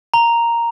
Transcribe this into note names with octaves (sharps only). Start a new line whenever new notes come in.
A#5